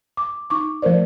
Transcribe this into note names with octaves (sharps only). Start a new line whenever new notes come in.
D6
D#4 C#6 D6
F3 A3 A#4 C5 D5